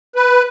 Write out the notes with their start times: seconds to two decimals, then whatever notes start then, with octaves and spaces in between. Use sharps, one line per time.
0.15 B4